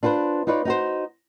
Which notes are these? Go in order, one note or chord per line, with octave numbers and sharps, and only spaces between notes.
D4 F4 F#4 B4 C5
D#4 F4 B4 C#5 D5
D#4 F#4 C5